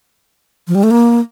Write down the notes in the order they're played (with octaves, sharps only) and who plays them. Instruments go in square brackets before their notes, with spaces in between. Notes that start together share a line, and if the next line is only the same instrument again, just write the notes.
[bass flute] F3
G3
A3
A#3